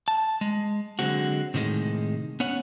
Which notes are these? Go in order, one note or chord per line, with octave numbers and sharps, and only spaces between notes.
A5
G#3
D3 F#3 G#3 C4 F#4
A2 C3 D#3 G3 G#3
B3 C#4 C#5 F#5